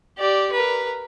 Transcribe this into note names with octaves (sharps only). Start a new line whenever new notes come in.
G4 D5
A#4 B4